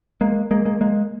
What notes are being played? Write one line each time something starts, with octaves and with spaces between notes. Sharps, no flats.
G#3 A#3
G#3 A#3
G#3 A#3
G#3 A#3